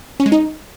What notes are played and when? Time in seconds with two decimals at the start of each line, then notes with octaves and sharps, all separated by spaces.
0.20 C#4
0.26 G#3
0.32 D#4